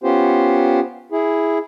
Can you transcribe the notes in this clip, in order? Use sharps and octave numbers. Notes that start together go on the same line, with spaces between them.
B3 C#4 F4 G4 C5
E4 G#4